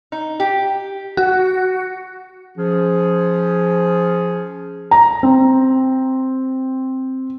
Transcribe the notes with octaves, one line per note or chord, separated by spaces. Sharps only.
D#4
G4
F#4
F3 C#4 G#4
A#5
C4